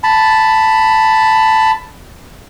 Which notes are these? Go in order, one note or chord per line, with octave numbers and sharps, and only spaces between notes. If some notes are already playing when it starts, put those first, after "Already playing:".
A5 B5